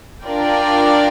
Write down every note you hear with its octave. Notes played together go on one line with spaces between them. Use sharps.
D4 F4 A#4 D5 G5